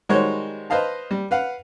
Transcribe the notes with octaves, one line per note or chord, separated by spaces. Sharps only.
D#3 G3 G#3 F#4 C5 C#5
B4 C5 D#5 F5 A5
G3
B4 F5 F#5